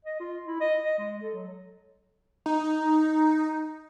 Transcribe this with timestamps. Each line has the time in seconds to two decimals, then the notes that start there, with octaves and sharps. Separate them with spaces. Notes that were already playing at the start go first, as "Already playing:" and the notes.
0.05 D#5
0.20 F4
0.47 E4
0.60 D#5
0.84 D#5
0.99 G#3
1.22 A4
1.34 F#3
2.46 D#4